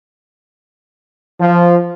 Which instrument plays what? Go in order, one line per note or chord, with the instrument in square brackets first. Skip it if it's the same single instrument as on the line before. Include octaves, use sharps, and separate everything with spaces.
[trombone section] F3